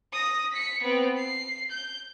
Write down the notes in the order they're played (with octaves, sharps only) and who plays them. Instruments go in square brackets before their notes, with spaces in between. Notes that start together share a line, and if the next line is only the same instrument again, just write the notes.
[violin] D#6 A#6
B6 C#7
B3 C4
C7
G6